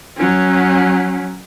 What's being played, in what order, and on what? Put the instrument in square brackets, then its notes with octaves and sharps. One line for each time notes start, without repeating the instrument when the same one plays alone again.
[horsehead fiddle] F#3 C#4